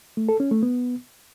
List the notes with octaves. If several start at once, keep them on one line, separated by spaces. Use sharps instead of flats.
A3
A4
C#4
A3
B3